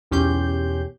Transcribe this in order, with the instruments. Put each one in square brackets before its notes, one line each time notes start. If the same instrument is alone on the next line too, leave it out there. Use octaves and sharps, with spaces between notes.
[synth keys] B1 E2 C#4 G4 C6 G6